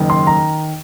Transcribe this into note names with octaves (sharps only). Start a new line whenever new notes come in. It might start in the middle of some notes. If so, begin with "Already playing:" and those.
Already playing: F#1 D#3
C6
A#5